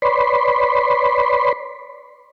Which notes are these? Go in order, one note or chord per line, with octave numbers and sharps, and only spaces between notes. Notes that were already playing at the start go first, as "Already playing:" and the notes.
B4 C#5 D5 B5 C6